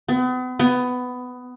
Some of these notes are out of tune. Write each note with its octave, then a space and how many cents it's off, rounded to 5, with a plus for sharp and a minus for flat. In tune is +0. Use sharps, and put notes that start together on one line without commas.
B3 +40
B3 +15